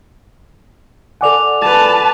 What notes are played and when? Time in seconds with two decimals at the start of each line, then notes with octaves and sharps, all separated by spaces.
1.21 A4 D5 F#5 G#5 D6 F7
1.62 B4 A5 A6 F7